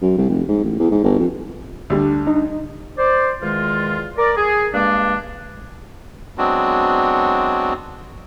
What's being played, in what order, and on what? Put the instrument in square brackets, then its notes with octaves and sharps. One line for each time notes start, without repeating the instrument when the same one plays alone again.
[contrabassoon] F#2
C2
F1
G#2
A1
E2
G#2
G1
F2
[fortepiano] D2 G3 [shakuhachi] D4
[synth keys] D#4
[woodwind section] C5 D5
E2 D#3 G#3 F4
A#4 D5
G#4
G2 G#3 A#3 D4
[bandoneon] F#3 G#3 B3 C4 D4 F#4